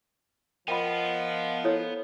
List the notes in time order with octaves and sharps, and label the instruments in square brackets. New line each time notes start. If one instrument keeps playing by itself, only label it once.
[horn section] F3 [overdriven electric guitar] B3 [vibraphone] A#4 D#5 F#5 [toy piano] G5 B5
[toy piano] E4 A4 C#5